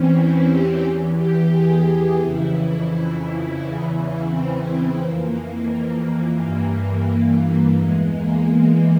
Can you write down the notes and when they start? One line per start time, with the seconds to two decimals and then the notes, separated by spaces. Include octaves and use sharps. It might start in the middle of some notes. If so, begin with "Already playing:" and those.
Already playing: E2 E3 C4 C#4
0.13 E4
0.47 G4
0.82 E2 E3
1.17 G4
1.52 G#4
1.86 G4
2.21 F2 C#3 E3 E4
3.60 E2 C#3 E3
4.30 C4
4.99 F2 E3 A#3
6.38 G2 E3 A#3
7.78 E2 E3 G#3
8.12 A#3